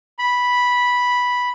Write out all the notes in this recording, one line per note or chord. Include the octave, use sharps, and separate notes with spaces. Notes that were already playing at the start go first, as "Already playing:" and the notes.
B5